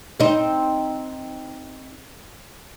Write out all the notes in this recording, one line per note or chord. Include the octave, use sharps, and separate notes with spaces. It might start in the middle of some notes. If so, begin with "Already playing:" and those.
C4 D#4